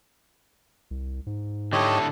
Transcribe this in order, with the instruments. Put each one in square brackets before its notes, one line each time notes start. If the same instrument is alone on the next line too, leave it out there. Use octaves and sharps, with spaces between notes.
[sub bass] C2
G#2
[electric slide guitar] D3 E4 A4 [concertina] G4 C#5 D#5